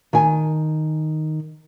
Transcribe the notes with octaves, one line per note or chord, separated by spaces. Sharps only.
D#3 G#5